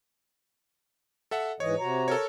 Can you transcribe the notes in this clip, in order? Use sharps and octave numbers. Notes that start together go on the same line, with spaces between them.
A4 E5 F#5
G#2 E3 C#5 D#5
C3 F#4 A#5
A4 A#4 C#5